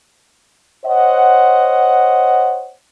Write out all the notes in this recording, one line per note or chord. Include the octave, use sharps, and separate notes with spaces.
C5 C#5 D#5 F#5